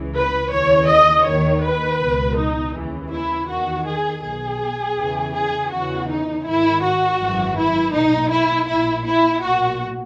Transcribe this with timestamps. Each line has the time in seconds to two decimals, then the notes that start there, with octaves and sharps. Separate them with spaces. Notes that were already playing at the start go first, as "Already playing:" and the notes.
Already playing: C#2 C#3 E3
0.14 B4
0.51 D#2 C#3 E3 C#5
0.89 D#5
1.26 D#2 D#3 C#5
1.63 B4
2.00 C#2 B2
2.37 D#4
2.74 D#2 C#3 E3
3.11 E4
3.49 E2 D#3 F#4
3.86 G#4
4.23 B1 B2 G#4
4.97 E2 C#3 E3
5.34 G#4
5.71 E2 C#3 E3 F#4
6.08 D#4
6.45 G#1 G#2 D#3 E4
6.82 F#4
7.20 G#1 F#2 E3
7.58 E4
7.93 B1 A#2 D#4
8.31 E4
8.68 A#1 A#2 E4
9.05 E4
9.42 B1 A#2 F#4